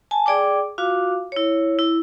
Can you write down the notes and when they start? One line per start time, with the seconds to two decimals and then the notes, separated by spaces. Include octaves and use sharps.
0.11 G#5 A5
0.26 G#4 D5 G5 D6
0.78 F4 F#4 F5 D6
1.32 E4 C#5
1.79 E4